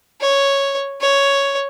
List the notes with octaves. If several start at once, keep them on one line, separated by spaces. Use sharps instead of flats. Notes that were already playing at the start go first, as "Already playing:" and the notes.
C#5
C#5